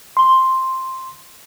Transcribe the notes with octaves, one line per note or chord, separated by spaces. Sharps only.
C6